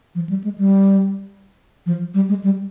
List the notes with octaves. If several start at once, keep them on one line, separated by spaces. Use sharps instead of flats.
F3
G3
G#3
G3
F3
G3
G#3
G3